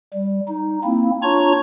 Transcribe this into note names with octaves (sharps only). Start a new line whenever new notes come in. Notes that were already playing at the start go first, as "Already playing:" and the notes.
G3
D#4
A#3 C4 E4
D4 F4 C#5 A#5 C#6